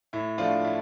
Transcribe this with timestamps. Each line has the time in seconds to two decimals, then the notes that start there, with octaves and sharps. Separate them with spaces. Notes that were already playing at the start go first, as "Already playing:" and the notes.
0.13 A2 E4
0.38 F3 A3 D4 F4
0.64 A2 E4